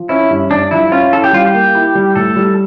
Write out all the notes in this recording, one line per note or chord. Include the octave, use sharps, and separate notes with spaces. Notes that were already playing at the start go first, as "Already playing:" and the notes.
Already playing: F3
C#4 E4
G2
G2 D4
F3 E4
C#4 F4
E4 A4
G4
G3 F4
G4
A#3
E4
G3
A2 A4
G3